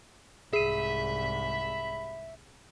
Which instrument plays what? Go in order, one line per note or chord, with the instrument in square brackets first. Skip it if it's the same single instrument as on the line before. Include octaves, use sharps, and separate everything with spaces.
[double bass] C2 G#2 [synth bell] G#4 D#7 [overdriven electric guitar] E5 [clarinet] B5